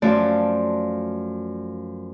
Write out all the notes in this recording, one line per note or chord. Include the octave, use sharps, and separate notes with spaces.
F#2 F3 A3 D5 A5 C6